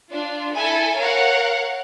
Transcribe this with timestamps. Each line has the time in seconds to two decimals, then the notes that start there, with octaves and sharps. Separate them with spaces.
0.11 D4 F4
0.55 E4 A4 G#5
0.97 A#4 C#5 F5 F#5